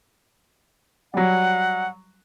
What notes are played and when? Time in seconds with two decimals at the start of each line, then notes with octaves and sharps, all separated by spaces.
1.14 F#3 G3 F#5